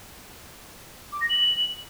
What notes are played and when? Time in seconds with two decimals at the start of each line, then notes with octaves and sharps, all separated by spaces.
1.12 D6
1.21 A#6
1.29 F#7